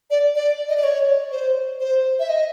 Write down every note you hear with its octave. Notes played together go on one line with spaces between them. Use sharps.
D5
D5
D#5
D5
C#5
C5
C5
E5
D#5